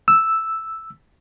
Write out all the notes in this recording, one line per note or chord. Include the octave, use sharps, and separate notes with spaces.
E6